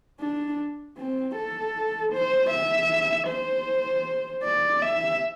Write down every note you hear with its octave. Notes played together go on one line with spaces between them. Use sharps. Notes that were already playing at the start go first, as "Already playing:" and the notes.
D4
C4
A4
C5
E5
C5
D5
E5